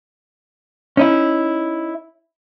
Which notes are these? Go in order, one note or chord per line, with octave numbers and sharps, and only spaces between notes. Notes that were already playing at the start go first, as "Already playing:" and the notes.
C#4 D#4 E4